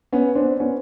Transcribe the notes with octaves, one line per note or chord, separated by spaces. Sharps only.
B3 C#4
C4 D4
B3 C#4